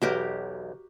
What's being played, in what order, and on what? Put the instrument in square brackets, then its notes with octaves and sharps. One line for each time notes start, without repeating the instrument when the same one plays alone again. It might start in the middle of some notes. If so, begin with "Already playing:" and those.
[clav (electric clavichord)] B1 E2 [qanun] F#4 G4 A#4